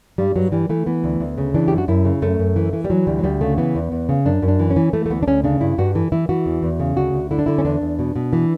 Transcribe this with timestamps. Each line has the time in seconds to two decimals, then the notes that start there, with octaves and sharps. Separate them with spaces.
0.18 G2 G3
0.36 G2 F#3
0.52 E3 G3
0.69 E3 A3
0.86 E3 B3
1.04 D2
1.20 D2
1.38 C#3
1.54 E3 D4
1.68 F#2 G4
1.78 F#4
1.88 F#2 E4
2.05 C#3
2.22 F#2 A3
2.39 F#2
2.56 E3
2.73 E3
2.85 G3
2.90 E3 F#3
3.07 D2 G3
3.19 F#3
3.24 D2 G3
3.41 C#3 A3
3.58 E3 B3
3.75 E2
3.92 E2
4.09 C#3
4.25 F#2 D4
4.42 F#2
4.48 D4
4.59 E3
4.70 C#4
4.76 E3
4.93 E3 A3
5.06 A3
5.10 D2 B3
5.23 D4
5.27 D2 C#4
5.44 C#3 D4
5.61 G2 E4
5.78 G2 F#4
5.95 E3 A4
6.12 E3 E4
6.29 E3 F#4
6.46 E2
6.63 E2
6.80 C#3
6.97 D2 F#4
7.14 D2
7.31 D3 E4
7.39 D4
7.46 D3 E4
7.58 C#4
7.65 E2 D4
7.82 E2
7.99 B2
8.16 B2
8.33 E3